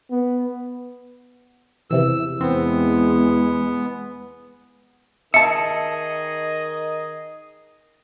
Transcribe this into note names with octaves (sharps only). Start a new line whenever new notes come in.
B3
E2 C3 E3 E6
E2 G#3 B3 C4
D#3 G#4 D#5 E5 A5 C#7